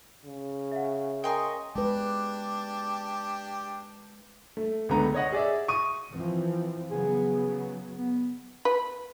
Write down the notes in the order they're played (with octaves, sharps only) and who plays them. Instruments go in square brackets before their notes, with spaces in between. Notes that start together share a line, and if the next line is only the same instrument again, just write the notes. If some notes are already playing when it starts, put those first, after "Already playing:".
[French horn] C#3
[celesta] E5 F#5
[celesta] A#4 G#5 A#5 [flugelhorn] D#5 [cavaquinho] G5 C6 C#6
[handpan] G#3 B4 [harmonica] D4 G4
[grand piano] A3
C#2 D3 A3 B3 A#5
C#5 D#5 F#5
G#4 D5 E5
C#6 D#6 D#7
[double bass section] E3 F3 C4
[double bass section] C#3 F#3 B3 [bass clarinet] G#4
[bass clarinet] B3
[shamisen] B4